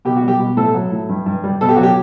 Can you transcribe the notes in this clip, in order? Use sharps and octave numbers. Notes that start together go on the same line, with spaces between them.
B2 G4
F#4
G3
G4
B2
A2 A4
F#3
A2
G2
G2
G3
B2 A4
G4
F#3 F#4
G4